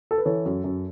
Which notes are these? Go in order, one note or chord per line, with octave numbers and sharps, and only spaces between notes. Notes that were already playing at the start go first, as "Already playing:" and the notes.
A4
B4
E3 A4 C#5
F#2
F#2